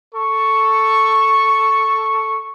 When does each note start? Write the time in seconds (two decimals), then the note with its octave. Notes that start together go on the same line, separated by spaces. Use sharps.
0.15 A4 C#6